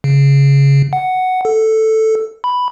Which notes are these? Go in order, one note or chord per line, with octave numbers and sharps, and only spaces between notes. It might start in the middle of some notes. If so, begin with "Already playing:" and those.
C#3
F#5
A4
B5